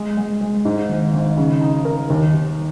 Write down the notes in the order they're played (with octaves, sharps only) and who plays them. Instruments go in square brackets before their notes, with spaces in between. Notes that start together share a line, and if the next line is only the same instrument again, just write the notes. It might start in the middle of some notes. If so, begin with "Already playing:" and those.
Already playing: [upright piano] G#3
G#3
G#3
G#2
G#1
G#1
C#3
D#4
A#4
D#2
D#2